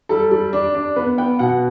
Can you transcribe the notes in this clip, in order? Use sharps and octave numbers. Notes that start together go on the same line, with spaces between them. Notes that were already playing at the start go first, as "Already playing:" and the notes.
G3 A4
G3
D4
D4
B3 B4
B3 G5
B2 F#5